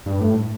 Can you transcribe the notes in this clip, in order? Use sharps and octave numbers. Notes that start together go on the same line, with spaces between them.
G2
A2